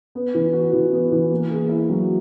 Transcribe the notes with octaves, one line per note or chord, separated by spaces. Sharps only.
B3
E3
F#4
E3
B3
E3
A#3
G#4
E4
F#3